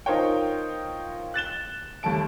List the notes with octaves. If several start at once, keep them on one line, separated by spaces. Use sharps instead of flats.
D#4 F4 A#4 C5 C#5 G5
F#6 A6 E7 G7
D#2 G3 A3 A5 D7